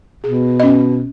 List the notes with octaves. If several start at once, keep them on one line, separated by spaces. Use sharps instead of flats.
B2 G#4
C#4 D#5